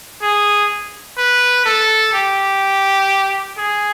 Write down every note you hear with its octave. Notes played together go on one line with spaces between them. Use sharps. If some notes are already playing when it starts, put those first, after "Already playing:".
G#4
B4
A4
G4
G#4